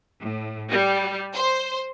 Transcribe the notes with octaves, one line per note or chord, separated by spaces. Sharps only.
A2
G3
C5